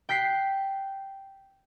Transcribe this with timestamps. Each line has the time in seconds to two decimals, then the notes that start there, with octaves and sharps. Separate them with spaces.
0.09 G5 F#6 B6 C7